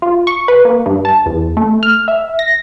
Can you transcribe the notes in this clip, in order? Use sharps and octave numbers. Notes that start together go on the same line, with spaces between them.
F4
C#6
B4
A#3
G2
A5
E2
A3
F6
E5
A#6